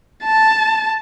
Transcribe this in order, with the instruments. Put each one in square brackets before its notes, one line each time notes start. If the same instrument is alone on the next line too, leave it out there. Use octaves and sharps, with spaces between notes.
[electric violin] A5